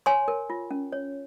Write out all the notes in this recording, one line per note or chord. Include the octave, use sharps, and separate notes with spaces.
C#5 G#5 C6
A#4
F4
C#4
C#5